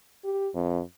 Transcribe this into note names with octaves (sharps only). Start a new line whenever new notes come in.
G4
F2